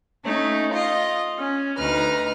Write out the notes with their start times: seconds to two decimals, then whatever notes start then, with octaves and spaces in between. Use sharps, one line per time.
0.25 A3 C#4 D#4
0.72 F4 D#5
1.40 C#4
1.78 D2 D#4 B4 A#5 F6